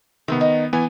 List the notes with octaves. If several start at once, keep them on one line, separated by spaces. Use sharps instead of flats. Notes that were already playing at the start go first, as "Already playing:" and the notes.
C3 D#3 B3 C4
D#4
E3 B3 G#5